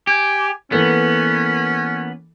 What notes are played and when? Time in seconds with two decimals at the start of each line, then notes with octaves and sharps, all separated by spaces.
0.07 G4 G#5
0.72 E3 A#3 B3 C#4 A4